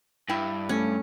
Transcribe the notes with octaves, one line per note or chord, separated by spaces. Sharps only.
G2 E4 G5
A3 C#4